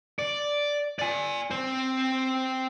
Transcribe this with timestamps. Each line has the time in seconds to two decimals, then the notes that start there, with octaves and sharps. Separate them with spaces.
0.19 D5
0.99 D5 G#5
1.51 C4 C5